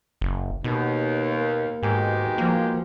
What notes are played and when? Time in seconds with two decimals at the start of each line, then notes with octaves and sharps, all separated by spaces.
0.21 F#1
0.64 D#2 B2
1.30 A#3
1.83 G#2 D#3 F#3 G#3 B3 G4 G#4
2.38 F3 A#3